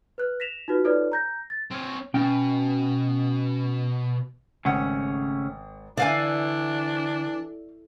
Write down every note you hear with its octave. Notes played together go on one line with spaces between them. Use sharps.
B4 F#6
A#6 B6 E7 F7
D#4 F4 F#4 B4
D#4 F4 A4 B4 C#5 D5
A#5 G6 A#6
A6
C4 C#5
B2 C#4 G5
G#1 C#3 A3 C#4 F#5
D3 E3 D4 D5 F5 G#5